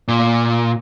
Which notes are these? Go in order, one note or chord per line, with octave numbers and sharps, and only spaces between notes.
A#2